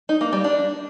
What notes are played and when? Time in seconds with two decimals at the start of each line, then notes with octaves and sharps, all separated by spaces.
0.09 D#4
0.21 A#3
0.33 G3
0.44 D4